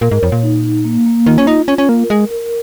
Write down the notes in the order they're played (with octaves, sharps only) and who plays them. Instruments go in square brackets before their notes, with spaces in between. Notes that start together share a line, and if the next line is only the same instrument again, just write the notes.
[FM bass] A#2 [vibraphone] A#4
[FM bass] G#2
[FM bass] F2 [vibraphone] C#5
[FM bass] A#2
[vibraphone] D#4
D#4
A#3
A#3
[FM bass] D#3 [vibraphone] F4
[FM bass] C#4
[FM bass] D#4 [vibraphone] F4
[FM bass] C#4 [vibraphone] F4
[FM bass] C#4
[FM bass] A#3 [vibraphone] A#4
[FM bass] G#3 [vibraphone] A#4
[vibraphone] A#4